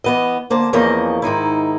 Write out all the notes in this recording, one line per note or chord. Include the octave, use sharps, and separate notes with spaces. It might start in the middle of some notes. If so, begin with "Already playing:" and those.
E3 B3 D#5
D3 A#3 C5 A5
E2 E3 F3 A#3 C#4 D#5
G#2 D#3 D#4 E4